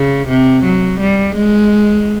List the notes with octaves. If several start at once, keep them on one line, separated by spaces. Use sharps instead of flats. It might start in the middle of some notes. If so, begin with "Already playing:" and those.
Already playing: C#3
C3
F#3
G3
G#3